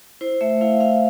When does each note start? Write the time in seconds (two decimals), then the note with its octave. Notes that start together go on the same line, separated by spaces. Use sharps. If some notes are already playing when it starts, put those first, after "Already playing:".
0.21 E4 C5
0.41 A3 E5
0.61 E4 F5
0.80 E4 F5